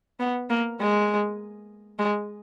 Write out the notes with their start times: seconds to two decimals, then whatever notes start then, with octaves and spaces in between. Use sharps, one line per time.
0.20 B3
0.50 A#3
0.80 G#3
1.99 G#3